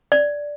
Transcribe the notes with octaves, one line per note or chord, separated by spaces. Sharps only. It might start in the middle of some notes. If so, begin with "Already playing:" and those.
D5